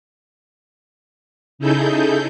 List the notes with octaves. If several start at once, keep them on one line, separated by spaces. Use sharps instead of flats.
C#3 D#4 E4 G#4 A4 G6